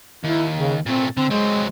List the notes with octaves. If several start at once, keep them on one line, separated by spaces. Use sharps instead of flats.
D#2 E4
C#3
A#2 A3 C4
D3 C4
F#3 G#3 C4